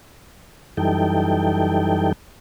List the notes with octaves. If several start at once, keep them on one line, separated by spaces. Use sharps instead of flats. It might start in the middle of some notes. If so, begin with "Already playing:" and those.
F#2 E3 G3 D#4 A4 G5